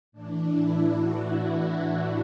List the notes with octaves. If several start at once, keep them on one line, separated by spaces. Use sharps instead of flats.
A2 E3 D4
E4
F#4
F#4
F#4